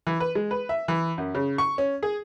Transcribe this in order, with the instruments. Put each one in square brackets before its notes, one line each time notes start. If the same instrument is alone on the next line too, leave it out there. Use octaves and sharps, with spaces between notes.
[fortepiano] E3
B4
G#3
B4
E5
E3
F#2
C#3
C#6
C#4
G#4